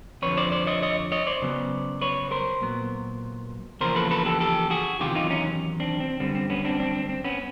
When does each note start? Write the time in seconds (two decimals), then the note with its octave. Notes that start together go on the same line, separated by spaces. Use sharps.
0.22 F2 D3 F3 B4 C#5
0.37 C5 D5
0.52 C5 D5
0.67 C#5 D#5
0.82 C#5 D#5
1.12 C#5 D#5
1.27 C5 D5
1.42 C#3 F#3 B3
2.01 B4 C#5
2.31 A#4 C5
2.61 A#2 F#3 B3
3.81 E2 C#3 F3 A#3 A#4 C5
3.95 A4 B4
4.11 A4 B4
4.26 G4 A4
4.40 G4 A4
4.70 F#4 G#4
5.00 E2 C3 D#3 F#3 F4 G4
5.15 D#4 F4
5.30 C#4 D#4
5.80 C4 D4
6.00 C4
6.20 F#2 D3 G3 B3 C4
6.35 C4
6.50 B3 C#4
6.65 C4 D4
6.80 C4 D4
6.95 C4
7.09 C4
7.24 B3 C#4